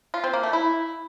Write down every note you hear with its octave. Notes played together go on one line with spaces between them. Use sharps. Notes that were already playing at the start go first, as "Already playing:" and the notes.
F4
C4
A#3
A3
E4